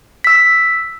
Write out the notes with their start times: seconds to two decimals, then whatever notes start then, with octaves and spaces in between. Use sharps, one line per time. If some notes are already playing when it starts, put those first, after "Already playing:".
0.24 E6 B6